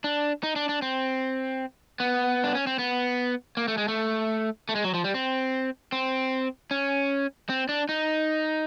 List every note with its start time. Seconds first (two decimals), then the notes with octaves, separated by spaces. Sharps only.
0.04 D4
0.43 D#4
0.56 D4
0.69 D4
0.82 C4
2.00 B3
2.44 D4
2.55 C#4
2.67 C4
2.79 B3
3.57 A#3
3.68 A3
3.78 G#3
3.88 A3
4.69 A3
4.75 G#3
4.84 F#3
4.94 F3
5.04 G3
5.14 C4
5.92 C4
6.71 C#4
7.49 C4
7.69 D4
7.89 D#4